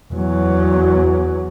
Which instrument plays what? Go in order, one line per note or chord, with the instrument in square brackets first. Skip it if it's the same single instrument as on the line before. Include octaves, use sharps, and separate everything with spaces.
[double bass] E2 F#3